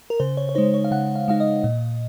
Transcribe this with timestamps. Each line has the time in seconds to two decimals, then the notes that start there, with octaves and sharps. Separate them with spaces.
0.10 A#4
0.20 C#3 C5
0.37 C#5
0.49 C#5
0.55 G#3 D#4 C5
0.74 C#5
0.84 F5
0.91 C#3 F#5
1.16 F5
1.28 G#3 D#4 F5
1.40 D#5
1.64 A#2